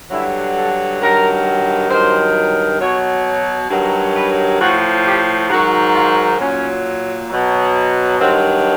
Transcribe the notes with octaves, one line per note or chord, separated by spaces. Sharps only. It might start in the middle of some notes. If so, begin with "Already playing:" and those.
G2 D3 F#3 E4
A4
G2 D#3 F#3 A#4
G2 D#3 F#3 C5
B2 F#3 C#5
C#5
G2 D#3 F#3
B4
A2 F3 F#4
G4
G#2 D#3 F#3 F#4
F4
A#2 F#3 C#4
B2 F#3
G2 D#3 F#3 C4